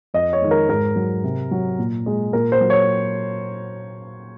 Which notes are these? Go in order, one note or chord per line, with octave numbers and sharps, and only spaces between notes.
F2 D#5
C#5
D#3 G#3
A#4
G#2 A#4
F#3
C3
F#3
A#2
G#3
A#2 A#4
C5
F#3
C#5